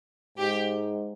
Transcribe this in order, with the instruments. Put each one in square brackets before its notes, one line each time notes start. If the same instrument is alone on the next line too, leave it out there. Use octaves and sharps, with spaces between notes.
[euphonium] G#2 [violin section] G4